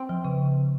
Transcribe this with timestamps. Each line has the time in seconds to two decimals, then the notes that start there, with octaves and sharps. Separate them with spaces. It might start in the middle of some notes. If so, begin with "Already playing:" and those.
Already playing: C4
0.09 F3
0.25 C#3